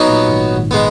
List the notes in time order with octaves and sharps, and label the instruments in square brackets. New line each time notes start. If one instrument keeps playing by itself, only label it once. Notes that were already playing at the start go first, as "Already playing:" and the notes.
Already playing: [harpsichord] F#3 B3 D#4 F#4
[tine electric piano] A#1 A#2
G#1 G#2
G#1 G#2
[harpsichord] G#3 B3